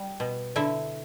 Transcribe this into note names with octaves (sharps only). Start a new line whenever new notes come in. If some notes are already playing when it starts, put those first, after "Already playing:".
Already playing: G3
B2
D3 E4 E5